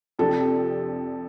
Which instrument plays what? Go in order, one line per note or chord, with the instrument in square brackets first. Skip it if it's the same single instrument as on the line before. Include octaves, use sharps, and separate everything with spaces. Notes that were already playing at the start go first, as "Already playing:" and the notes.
[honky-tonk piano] F2 C3 F3 D4 G4 [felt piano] A4